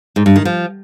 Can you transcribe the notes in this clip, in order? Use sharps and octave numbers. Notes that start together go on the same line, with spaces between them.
G#2
G2
D#3
F3